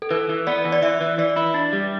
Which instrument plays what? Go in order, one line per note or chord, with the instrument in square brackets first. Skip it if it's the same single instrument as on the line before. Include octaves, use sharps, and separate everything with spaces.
[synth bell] A4
[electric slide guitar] E3 [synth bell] B4
[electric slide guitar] E3
[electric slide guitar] B3 [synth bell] D5
[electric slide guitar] E3
[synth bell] D5
[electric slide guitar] E3 [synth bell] E5
[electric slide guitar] E3
[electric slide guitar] E3 [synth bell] D5
[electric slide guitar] E4
D4
G3